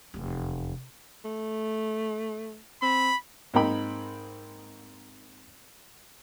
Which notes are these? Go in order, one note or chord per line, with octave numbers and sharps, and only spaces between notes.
F1 E2
A3
C4 B5
G#2 A#3 C4 D#4 G5 B5